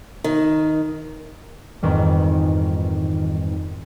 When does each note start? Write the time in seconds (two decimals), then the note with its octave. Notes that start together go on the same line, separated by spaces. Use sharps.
0.24 D#3
1.83 F2 G#2 D#3 E3 G3